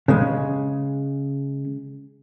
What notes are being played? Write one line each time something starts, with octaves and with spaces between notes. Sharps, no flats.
C#3 G#3